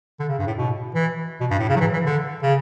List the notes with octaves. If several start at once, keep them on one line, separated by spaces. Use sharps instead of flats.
D3
C#3
G2
A2
B2
E3
B2
G2
A2
C#3
F#3
E3
E3
D3
C#3